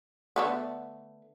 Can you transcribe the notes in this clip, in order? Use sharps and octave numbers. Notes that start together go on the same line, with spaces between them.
D3 A3 B3